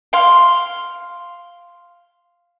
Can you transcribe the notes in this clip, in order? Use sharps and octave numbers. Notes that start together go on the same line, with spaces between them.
F5 C6